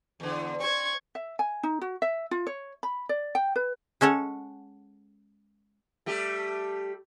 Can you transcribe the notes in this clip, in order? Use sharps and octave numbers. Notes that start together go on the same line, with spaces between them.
E2 D3
C4 C5 C#6 G#6
E5
G#5
D#4
F#4
E5
F4
C#5
B5
D5
G5
B4
G#3 C#4 A4 C#5 F#5
G3 A3 G4